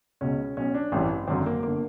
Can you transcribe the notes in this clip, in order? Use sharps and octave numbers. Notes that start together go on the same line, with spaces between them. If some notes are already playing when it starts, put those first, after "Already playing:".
C#2 B2 C#4
B1 B2 C#4
D4
A1 G2 E3 C4
G#1 F#2 D3 C4
A#3
G1 D3 A#3